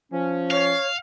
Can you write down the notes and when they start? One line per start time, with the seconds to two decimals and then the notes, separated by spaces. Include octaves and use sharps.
0.13 F3 C#4
0.51 C#5 F5